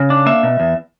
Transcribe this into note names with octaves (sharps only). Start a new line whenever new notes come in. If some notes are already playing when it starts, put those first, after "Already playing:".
Already playing: C#3
D4
A#3 E5
B2
E2